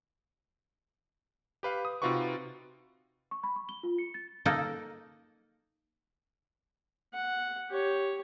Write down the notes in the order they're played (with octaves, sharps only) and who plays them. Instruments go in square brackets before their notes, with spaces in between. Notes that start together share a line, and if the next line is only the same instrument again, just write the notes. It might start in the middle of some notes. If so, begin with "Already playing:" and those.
[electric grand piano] G4 B4 F5
D#6
C3 D#4 F4 F#4 B4 C#6
[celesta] C#6
B5
C#6
G7
F4
C#7
A6
[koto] A#3 D#4 A4
[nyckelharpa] F#5
G4 C#5